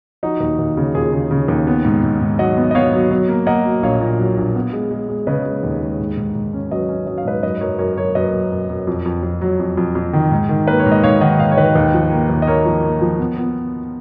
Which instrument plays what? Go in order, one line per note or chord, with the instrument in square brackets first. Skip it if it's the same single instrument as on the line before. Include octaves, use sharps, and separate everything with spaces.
[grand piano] F3 D#4 F#4
D#2
D#2
C#3
D#2 F4 G#4
C#3
C#3
D#2
B3
G#2
G#2
G#2
F#3 D#5 F#5
B3
D#5
B3 C#5 F5
F#3
F#3
A#3
A#3 D#5 F#5
F#3
A#1 C#5 F5
A#2
F#3
A#1
B3
G#3
G#3
G#3
C#3 B4 D#5
G#3
D#2
G#3
G#2
G#2
G#2
C#4
F#3 B4 D#5
C#4
F#3 D#5
F5
G#2 B4 D#5
F#2 B4 D#5
F#2 A#4 C#5
F#2 A#4 C#5
F#2 A#4 C#5
F#2 B4 D#5
F#2
F#2
F#2
F2
F2
F2
F#3
F2
F2
F2
D#3
G#2
D#3
A#3 B4
C#5
G#2
D#5
G#2 C#5 F5
D#3 D#5 F#5
G#2 C#5 F5
C#5
D#3 B4 D#5
D#2
F3
A#3
D#2
D#5
A#3 A#4 C#5
F3
A#3
F3
B3
B3